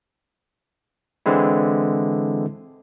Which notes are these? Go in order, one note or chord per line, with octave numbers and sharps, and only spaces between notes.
D3 E3 G#3 C4 E4